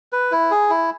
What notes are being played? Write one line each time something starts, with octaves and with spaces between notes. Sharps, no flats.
B4
E4
G#4
E4